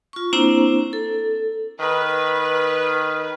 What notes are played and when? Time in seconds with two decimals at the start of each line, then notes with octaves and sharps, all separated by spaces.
0.13 F4 C#6
0.33 A#3 C4 D4 E4 C5 A#5
0.93 A4
1.80 D#3 B4